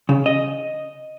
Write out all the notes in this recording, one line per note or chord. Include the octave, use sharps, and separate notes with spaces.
C#3
D#5